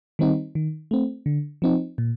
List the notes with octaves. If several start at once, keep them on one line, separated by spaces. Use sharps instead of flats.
D#3 G3 C4 D#4
D#3
A3 C4
D3
F3 C4 D#4
A#2